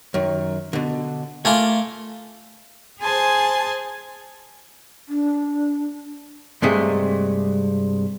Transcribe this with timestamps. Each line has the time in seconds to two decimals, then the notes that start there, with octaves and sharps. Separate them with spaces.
0.14 F#2 D#3
0.73 B2 D3
1.45 A3 A#3 F4 G#5
3.00 G#4 C5 G#5 A5 C6
5.09 D4
6.62 G2 C3 G#3 A3